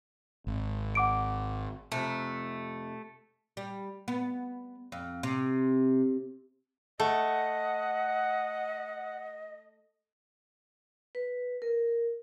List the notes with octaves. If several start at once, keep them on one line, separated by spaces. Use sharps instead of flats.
G#1
F#5 D6 D7
F2 C3 A3
G3
B3
F2
C3
A3 D#5 F#5
B4
A#4